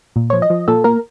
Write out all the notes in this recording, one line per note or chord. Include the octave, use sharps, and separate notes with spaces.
A#2
F3 C#5
D#5
F3
A#2 A4
A#3 A#4